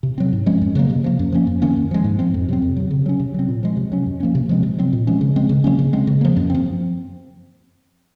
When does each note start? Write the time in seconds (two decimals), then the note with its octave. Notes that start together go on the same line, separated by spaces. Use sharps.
0.03 C3
0.18 F#3 C4
0.33 G#2
0.46 F3 G#3 C#4
0.61 F#2
0.75 C#3 F#3 A#3
0.90 C3
1.04 F3 A#3
1.19 F#2
1.32 F3 A#3 C#4
1.47 F#2
1.62 D#3 A#3 C#4
1.76 F#2
1.91 F3 G#3
2.04 G#2
2.19 F3 C4
2.34 F2
2.49 C3 F#3 C4
2.62 F2
2.76 C3 F#3
2.90 C#3
3.06 F#3 C#4
3.19 C3
3.34 F#3 C4
3.48 A#2
3.63 F3 G#3
3.77 C3
3.92 F#3 C#4
4.06 F#2
4.20 F3 A#3 C#4
4.35 C3
4.49 F3 G#3 C4
4.63 C3
4.78 F#3 C4
4.93 A#2
5.07 F3 G#3 C#4
5.21 C#3
5.36 G#3 C4
5.49 C#3
5.64 F#3 A#3 C#4
5.79 C#3
5.93 G#3 C4
6.07 C#3
6.21 F3 A#3
6.36 F#2
6.50 F3 C4